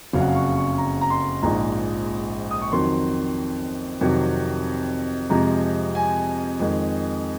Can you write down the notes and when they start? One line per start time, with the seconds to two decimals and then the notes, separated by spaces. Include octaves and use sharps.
0.13 F#1 F2 C#3 F#3 F5
0.20 F#5
0.28 F5
0.35 C#6
0.57 C#6
0.78 A#5
1.01 A#5
1.10 C6
1.43 A#1 G#2 F3 G#3 A#5
2.51 D#6
2.62 C#6
2.72 F2 D#3 F#3 C6
4.01 F2 C3 D#3 F#3
5.30 F2 C3 F3 G#3 A#5
5.95 G#5
6.60 F2 D#3 G#3